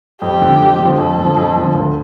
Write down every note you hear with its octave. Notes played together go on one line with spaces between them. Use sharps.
F2 G4
D3 F3
F2
D3 F3
F2 A4
D3 F3
F2
D3 F3
D2